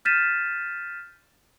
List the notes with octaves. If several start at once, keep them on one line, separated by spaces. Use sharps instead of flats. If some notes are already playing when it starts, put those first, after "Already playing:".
F6 G6 A6 B6 D#7 E7